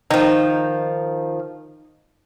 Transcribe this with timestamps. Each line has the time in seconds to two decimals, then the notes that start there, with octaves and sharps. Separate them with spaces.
0.10 D#3 F3 D#4